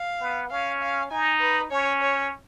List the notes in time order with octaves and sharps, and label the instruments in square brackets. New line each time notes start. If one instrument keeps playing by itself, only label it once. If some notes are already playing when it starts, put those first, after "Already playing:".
Already playing: [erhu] F5
[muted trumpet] B3
[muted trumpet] C#4 [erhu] F5
[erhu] F5
[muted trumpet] D#4 [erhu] G#5
[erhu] B4
[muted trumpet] C#4 [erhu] C#5
[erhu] C#5